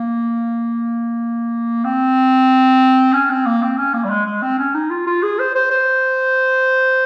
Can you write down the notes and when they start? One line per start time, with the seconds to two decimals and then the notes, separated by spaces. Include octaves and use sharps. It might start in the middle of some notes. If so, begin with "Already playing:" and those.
Already playing: A#3
1.85 C4
3.13 C#4
3.30 C4
3.46 A#3
3.62 C4
3.78 C#4
3.94 A#3
4.04 G3
4.10 G#3
4.26 G#3
4.42 C4
4.59 C#4
4.75 D#4
4.91 F4
5.07 F4
5.23 G#4
5.39 C5
5.55 C5
5.71 C5